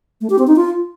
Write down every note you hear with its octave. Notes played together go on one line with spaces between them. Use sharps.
A3
G4
C4
D#4
F4